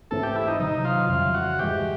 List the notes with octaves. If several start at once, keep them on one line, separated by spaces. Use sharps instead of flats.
G#2 E3 A3 C4 A4
G4
E4
D#4
C3 D#3 F#3 D#4
F4
F2 C#3 E3 G3 F4
F#4
G#2 E3 G#3 G4